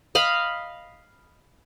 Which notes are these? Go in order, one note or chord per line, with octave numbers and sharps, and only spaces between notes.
D#5 F5 B5